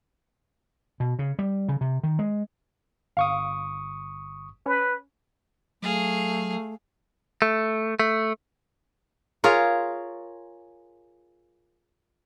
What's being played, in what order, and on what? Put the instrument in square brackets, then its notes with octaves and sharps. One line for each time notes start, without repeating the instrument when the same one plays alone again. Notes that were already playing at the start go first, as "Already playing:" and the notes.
[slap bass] B2
C#3
G3
C#3
C3
D#3
G#3
[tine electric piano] G1 C#6 D#6 [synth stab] F5
[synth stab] C#4 [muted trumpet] B4
[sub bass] F#3 [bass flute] A3 [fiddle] G#4 F5
[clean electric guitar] A3
A3
[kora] F4 G#4 A#4 C#5